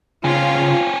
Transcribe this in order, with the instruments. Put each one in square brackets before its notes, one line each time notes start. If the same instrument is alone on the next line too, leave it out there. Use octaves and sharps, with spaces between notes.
[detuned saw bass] C#3 [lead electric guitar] C4 C#4 [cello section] F4